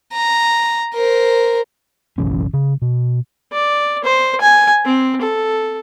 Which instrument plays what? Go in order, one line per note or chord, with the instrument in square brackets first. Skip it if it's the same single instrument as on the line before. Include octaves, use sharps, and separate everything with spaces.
[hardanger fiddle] A#5
A#4 C5
[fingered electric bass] F#1 B1 E3 C#4
C#3
B2
[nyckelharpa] D5
C5
G#5
C4
A4